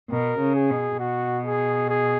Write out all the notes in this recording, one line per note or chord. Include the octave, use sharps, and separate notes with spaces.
B2 A#4
C#3
G#4
B2
B2 F#4
G#4
G#4